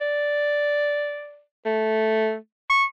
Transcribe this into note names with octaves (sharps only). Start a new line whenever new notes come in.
D5
A3
C#6